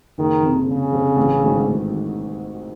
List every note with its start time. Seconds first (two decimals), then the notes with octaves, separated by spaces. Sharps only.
0.18 F#1 D#3
0.43 F2 C3
0.68 F#1 C#3
0.93 F2 C3
1.17 A1
1.42 G#2 D#3 F#3 A3
1.67 A1
1.92 D#3